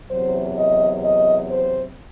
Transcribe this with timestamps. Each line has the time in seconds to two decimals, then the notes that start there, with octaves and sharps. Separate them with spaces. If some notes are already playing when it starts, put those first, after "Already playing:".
0.11 E2 C3 F#3 C5
0.57 D#5
1.04 D#5
1.50 C5